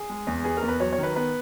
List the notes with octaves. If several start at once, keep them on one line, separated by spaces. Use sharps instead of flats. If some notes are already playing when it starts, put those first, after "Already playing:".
Already playing: G#4
G#3
E2
B3 G#4
A#4
E2
B4
F#3 C#5
C#5
D#3 B4
B3 B4